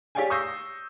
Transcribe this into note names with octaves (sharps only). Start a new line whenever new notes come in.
G4 C#5 D5 F5 G5 G#5
C#6 D#6 E6 G6 A#6 C7